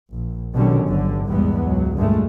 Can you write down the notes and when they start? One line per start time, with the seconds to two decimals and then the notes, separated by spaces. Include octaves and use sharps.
0.13 A#1
0.54 B2 D3 D#3 F#3 G3 C#4
0.85 G1 D3
1.29 A#1 E2 G#2 G3 G#3 B3
1.65 C#2 F#3
1.96 G2 A#2 D3 G#3 A3